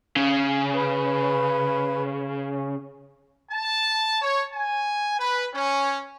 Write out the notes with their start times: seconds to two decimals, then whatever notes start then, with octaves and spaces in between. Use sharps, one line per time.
0.17 C#3
0.75 B4
3.51 A5
4.21 C#5
4.51 G#5
5.19 B4
5.52 C#4